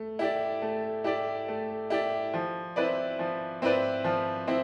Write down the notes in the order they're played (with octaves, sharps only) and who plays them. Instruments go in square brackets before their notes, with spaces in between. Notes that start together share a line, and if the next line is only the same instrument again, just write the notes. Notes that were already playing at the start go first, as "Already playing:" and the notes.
Already playing: [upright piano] A3
E4 G4 D5
A3
E4 G4 D5
A3
E4 G4 D5
F3
C4 E4 B4 D5
F3
C4 E4 B4 D5
F3
C4 E4